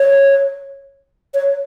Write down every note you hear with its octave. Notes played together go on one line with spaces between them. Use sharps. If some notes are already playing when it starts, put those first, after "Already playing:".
Already playing: C#5
C#5